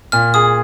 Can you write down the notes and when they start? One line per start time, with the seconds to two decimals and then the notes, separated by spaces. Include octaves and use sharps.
0.12 A#2 F6
0.34 G#4 D#6